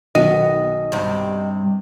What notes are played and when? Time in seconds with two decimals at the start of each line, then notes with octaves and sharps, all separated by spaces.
0.15 B1 D#3 B3 D#5 D#7
0.92 G2 C3